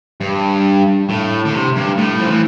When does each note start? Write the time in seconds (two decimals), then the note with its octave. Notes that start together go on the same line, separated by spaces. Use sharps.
0.21 G2
1.09 A2
1.45 D3
1.54 C3
1.76 G2
1.98 A2
2.20 F3
2.30 E3